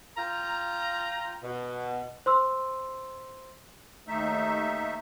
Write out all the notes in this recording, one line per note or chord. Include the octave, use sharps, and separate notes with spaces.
F4 F5 G5 A#5
B2
C5 C6 E6
D#2 A3 D#4 E5